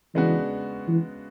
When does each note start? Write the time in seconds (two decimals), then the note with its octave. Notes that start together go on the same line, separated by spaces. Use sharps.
0.15 C#3 E3 G#3 B3 D4 F#4
0.87 E3